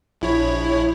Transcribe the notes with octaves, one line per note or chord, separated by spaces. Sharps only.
A#1 E4 C#5